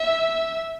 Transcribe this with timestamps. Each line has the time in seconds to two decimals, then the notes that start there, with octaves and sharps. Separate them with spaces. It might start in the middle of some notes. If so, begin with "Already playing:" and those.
Already playing: E5